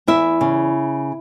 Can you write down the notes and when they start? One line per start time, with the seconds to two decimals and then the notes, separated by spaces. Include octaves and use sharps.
0.07 E2 E4 E5
0.41 C#3